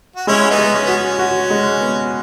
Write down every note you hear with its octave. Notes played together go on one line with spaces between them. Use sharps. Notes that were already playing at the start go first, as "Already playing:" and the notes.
F#4
G#3 C#4 E4
B3 D#4
G#3
C#4
B3 F#4
C#4
F#4
G#3
B3